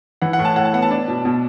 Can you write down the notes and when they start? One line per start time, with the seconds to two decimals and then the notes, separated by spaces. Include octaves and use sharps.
0.22 E3 F#5
0.33 F#5
0.39 A2
0.45 A5
0.56 A2 F#5
0.65 A5
0.73 B3 F#5
0.82 A5
0.91 D4
1.08 B2
1.25 B2